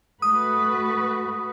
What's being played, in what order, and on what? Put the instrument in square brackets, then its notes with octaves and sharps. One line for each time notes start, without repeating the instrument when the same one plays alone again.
[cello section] A3 F#4 B4 [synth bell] D#6